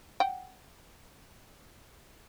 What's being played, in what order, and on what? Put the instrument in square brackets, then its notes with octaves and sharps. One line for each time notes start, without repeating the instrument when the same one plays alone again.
[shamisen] F#5 G5